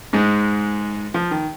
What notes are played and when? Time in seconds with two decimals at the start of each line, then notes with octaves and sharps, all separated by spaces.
0.13 G#2 G#3
1.14 F3
1.31 D#3